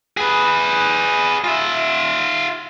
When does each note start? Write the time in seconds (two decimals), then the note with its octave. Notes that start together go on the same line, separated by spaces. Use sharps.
0.17 G#4 B4
1.44 F4 E5